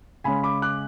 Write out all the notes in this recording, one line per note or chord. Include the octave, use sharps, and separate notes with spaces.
C#3 G#3 C#4 G#5 B5
B5 D6
D6 F#6